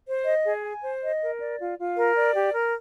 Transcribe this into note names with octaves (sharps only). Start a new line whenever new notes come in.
C5
D#5
G#4
G#5
C5
D#5
A#4
D5
F4
F4
A#4
D5
G4
A#4